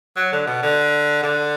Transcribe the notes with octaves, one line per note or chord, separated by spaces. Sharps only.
F#3
D3
B2
D3
D3